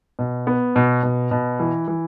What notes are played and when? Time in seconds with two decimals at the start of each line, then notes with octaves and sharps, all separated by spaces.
0.19 B2
0.47 B3
0.76 B2
1.03 B2
1.31 B2
1.60 E3
1.88 E3